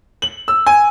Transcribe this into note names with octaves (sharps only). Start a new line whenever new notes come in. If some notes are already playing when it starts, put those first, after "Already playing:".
F#7
E6
G#5